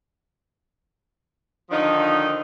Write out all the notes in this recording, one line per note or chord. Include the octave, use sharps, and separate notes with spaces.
D3 D#3 F3 D4 D#4